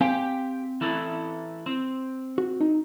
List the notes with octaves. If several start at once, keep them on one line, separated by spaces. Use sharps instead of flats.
C4 G4 F5 G5 G#5
E3 E4 A4
C4
F#4
D#4